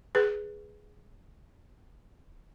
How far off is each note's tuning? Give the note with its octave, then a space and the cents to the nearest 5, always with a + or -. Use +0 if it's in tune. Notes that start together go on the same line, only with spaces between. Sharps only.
G#4 +0 B4 +0